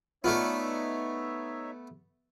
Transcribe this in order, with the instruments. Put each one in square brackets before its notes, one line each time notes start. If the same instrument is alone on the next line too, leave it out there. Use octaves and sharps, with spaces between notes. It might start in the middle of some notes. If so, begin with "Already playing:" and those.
[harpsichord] A3 B3 [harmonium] D#4 C#5 E5 [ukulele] F4 D5